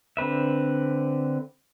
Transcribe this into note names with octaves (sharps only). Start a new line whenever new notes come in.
D3 C4 B4 E5